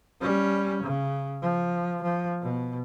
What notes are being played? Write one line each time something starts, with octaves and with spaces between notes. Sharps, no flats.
G3 C#4
C#3
F3
F3
B2